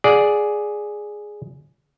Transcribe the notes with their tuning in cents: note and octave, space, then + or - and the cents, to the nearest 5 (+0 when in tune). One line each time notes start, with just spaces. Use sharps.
G#4 +0 D5 +0 F#5 -40